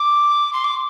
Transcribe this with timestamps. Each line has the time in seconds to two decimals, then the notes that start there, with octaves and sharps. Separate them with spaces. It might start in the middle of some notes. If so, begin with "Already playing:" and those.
Already playing: D6
0.53 C6
0.64 D6